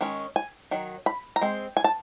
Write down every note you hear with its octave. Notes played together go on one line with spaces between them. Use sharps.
D#3 G#3 C#4
G#5
D#3 F#3
B5
A#5
G#3 C4
G#5
A5